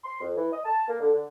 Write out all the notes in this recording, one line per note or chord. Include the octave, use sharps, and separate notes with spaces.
C6
F2
E3
D#5
A5
A#3
D3
D3